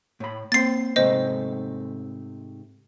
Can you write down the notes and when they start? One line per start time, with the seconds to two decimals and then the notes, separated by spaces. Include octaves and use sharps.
0.20 A2 B5
0.52 A#3 C4 C5 A6 C7
0.96 G#2 C3 A3 C5 D#5